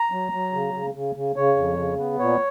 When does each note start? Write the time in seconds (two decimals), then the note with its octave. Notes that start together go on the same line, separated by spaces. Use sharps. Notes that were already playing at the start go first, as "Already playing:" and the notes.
Already playing: A#5
0.11 F#3
0.32 F#3
0.53 C#3
0.74 C#3
0.94 C#3
1.15 C#3
1.36 C#3 C#5
1.56 F2
1.77 C#3
1.98 B3
2.19 A#2 C#5